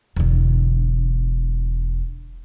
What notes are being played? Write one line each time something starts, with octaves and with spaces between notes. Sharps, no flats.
E1 D3